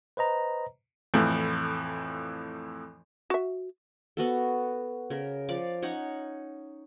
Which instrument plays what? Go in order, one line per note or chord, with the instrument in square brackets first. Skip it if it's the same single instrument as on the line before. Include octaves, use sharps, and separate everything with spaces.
[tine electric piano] B4 C5 D#5 A#5
[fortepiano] F2 A2 E3 F3
[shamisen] F#4 E5
[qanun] B3 F#4 A4
C#3 A#4
F3 D5 F5 D6
C#4 D#4 C#5 F#5